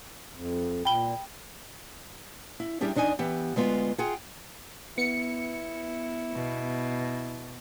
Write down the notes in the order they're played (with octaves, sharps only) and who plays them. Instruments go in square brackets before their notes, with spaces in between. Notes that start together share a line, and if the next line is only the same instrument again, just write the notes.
[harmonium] F2
[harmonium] A#2 [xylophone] G5 B5 G7
[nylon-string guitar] E4
G3 D4 E4 G4 G#4
E2 D4 D#4 D#5 G#5
E3 B3 G4
D2 G#3 B3 F4
F4 G#4 F#5 G5
[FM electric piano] B3 [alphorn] E4 [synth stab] C#7
[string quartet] B2